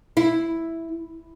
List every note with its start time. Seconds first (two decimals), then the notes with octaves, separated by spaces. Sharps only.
0.17 E4